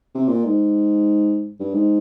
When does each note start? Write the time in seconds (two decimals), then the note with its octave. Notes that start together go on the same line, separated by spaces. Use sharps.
0.15 C3
0.29 A#2
0.45 G#2
1.60 G2
1.74 G#2